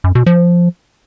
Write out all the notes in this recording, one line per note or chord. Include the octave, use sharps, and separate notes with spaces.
F#2
B2
F3